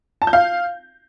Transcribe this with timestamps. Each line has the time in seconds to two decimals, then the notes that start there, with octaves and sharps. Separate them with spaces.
0.22 A5
0.27 G6
0.33 F5